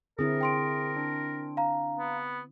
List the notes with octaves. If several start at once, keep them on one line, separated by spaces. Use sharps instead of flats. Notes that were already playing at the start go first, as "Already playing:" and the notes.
D3 C4 E4 G#4 A#4
G5 C6 D7
D4
F5 A#5
B3